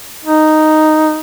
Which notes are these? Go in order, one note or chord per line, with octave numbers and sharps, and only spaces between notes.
D#4